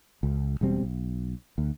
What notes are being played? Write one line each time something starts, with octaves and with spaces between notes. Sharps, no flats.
C#2
E1 B2 G3 C4
B1
D2